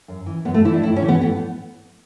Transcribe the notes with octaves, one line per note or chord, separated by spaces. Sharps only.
F#2
E3
F#2 B3
A3
E3 E4
D4
A2 E4
C#4
E3
B3
A2 B3